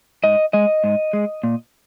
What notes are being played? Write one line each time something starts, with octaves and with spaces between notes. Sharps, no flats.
G#2 D#5
G#3 D#5
G#2
G#3
A#2